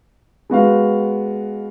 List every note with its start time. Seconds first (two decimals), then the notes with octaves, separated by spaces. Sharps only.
0.50 G#3 B3 F#4 F5